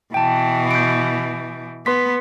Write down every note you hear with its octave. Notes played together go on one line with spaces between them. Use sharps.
B2 E3 G5 A5
G6 D7
B3 B4 C6 B6